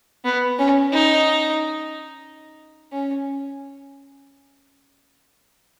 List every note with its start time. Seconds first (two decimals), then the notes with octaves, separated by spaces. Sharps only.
0.24 B3
0.59 C#4
0.92 D#4
2.92 C#4